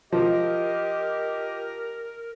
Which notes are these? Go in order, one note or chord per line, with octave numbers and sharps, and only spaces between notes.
F3 G4 A#4 D#5